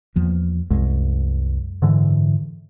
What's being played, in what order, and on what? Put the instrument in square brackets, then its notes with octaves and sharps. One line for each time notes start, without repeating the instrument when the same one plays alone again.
[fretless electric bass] E2 F3 A#3
[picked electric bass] C2 [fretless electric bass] F#2 G#3
[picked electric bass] G#2 D3 E3